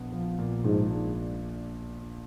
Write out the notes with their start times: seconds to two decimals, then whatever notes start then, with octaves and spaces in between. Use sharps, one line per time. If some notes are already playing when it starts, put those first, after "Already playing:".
Already playing: A#1 B3
0.12 F3
0.39 A#2
0.64 A#1 G#2
0.90 D4